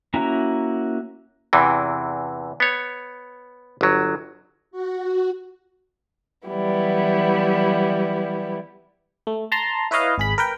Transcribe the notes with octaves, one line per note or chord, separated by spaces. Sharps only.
A#3 C#4 E4 F#4 A#5
E2 C3 E3
B3 C#5
G1 F#3
F#4
E3 F#3 G3 B3 E4
A3
A5 A#5 C6
E4 B4 C#5 D#5 F5
G#1 G#4 B5
A#4 B4 G5